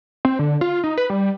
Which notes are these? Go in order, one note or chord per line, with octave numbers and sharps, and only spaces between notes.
C4
D3
F4
D#4
B4
G3